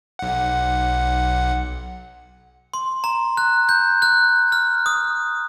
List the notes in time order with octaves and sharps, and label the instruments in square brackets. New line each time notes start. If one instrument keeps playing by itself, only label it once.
[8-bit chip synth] B1 F#5
[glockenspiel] C6
A#5
F#6
G6
F#6
F6
D#6